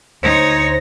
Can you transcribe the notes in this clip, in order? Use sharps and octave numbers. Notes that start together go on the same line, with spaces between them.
D2 D#4 C5 C#5 A#6